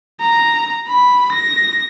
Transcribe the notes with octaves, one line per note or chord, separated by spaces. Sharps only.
A#5
B5
A#6